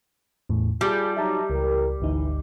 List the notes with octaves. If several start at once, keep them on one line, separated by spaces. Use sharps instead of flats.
E2 A2
G3 F4 G#4 A5 G6
F#3 D#4 E5 A5 A#5
C#2 E3 G4 A#4
G#1 D2 E3 D#4